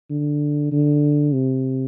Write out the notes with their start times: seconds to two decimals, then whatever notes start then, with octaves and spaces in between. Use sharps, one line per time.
0.10 D3
0.72 D3
1.34 C3